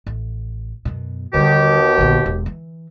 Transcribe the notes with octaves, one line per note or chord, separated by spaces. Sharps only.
A1
F#2 B2
D#2 B2 D3 G3 G4
A#1 D3
E1
E3